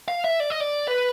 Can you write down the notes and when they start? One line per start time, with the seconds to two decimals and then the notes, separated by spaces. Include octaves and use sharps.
0.08 F5
0.24 E5
0.40 D5
0.50 D#5
0.60 D5
0.88 B4